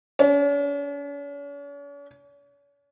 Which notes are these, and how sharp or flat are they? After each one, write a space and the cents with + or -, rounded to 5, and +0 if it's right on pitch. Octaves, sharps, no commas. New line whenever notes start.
C#4 +45